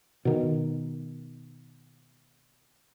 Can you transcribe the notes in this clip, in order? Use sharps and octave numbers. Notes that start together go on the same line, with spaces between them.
B2 D#3